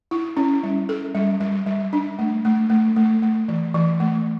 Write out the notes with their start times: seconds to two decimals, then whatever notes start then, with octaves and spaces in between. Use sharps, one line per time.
0.11 E4
0.37 C#4
0.63 G3
0.89 A4
1.15 G3
1.40 G3
1.66 G3
1.93 D4
2.19 A3
2.45 A3
2.70 A3
2.96 A3
3.22 A3
3.48 E3
3.74 E3
4.00 A3